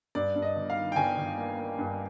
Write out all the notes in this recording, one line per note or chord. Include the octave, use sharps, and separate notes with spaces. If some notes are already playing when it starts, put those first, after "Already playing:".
G2 D5
G2
D#5
G1
F5
D#3
G5
G1 G#5
G1
A#3
A#3
G2